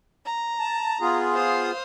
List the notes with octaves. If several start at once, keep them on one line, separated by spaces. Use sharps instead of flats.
A#5
A5
B3 F4 G#4
C5 F5 D#6